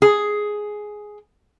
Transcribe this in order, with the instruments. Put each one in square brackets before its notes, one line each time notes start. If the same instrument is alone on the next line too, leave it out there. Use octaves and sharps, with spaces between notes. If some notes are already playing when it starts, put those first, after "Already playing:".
[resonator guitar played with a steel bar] G#4